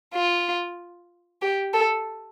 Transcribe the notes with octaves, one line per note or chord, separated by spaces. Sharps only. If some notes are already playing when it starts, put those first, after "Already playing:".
F4
G4
A4